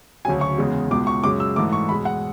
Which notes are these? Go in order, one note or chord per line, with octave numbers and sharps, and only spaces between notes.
D2 C#3 F#3 G#5
C#6
E2 C#3 G#3
C#2 B2 G#3 D6
C#6
F#2 C#3 G#3 D6
E6
G#2 E3 A3 D6
C#6
E2 B2 G#3 B5
F#5